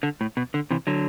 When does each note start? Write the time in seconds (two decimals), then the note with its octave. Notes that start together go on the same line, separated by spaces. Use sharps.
0.03 D3
0.21 A2
0.37 B2
0.54 D3
0.71 C3 E3
0.87 D3 F#3